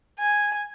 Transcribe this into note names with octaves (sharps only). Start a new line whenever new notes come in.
G#5